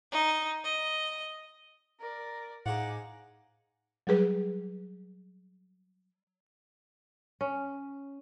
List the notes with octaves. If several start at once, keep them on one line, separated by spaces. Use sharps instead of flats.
D#4
D#5
A#4 D5
A2 D#4 F4 G#4 C5 F#5 D6
F#3 G3 G#4 B4
C#4